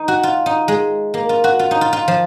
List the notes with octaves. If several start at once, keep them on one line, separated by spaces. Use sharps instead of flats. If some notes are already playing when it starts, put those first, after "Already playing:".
Already playing: D#4
F#4
F4
D#4
G#3
A#3
F4
F#4
F4
D#4
F4
F4
F3